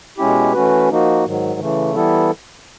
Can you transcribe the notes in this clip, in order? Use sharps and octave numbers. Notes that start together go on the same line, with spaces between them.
B2 G#3 C#4 E4 G4
E3 A3 C#4 F#4 B4
F3 A#3 D#4 F#4
G#2 D#3 F#3
C#3 E3 A3
E3 G3 B3 E4 A4